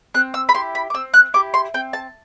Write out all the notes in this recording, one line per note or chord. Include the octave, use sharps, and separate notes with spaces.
C4 F#6
E6
B5
E4 G4 C6
B5
D6
C4 E6
F#6
E4 G4 D6
C6
C4 G5
A5